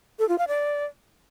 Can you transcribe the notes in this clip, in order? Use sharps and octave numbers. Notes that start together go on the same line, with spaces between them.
A4
F4
F5
D5